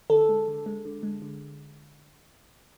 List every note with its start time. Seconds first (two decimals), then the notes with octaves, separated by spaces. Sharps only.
0.10 D3 A4
0.29 G#3
0.48 D3
0.66 G#3
0.85 D3
1.03 G#3
1.22 D3